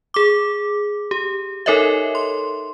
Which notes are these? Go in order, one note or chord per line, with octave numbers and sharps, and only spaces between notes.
G#4 D6
G4
D#4 A4 A#4 C#5 D#5 E5
C6